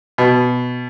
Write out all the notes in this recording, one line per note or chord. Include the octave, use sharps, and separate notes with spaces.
B2